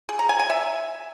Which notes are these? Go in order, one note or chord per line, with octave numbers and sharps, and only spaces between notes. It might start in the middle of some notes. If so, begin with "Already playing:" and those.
G#4
A#5
G#5
G#5
E5